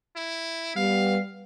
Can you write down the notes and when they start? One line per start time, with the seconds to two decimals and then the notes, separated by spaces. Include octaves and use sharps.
0.16 E4
0.76 G3 B3 F5